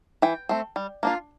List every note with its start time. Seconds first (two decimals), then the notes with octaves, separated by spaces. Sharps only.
0.22 E3 G5
0.49 A3 C4
0.76 G3
1.03 A#3 D4 F4